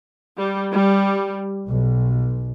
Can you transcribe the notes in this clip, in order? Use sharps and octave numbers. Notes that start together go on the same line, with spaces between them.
G3
G3
B1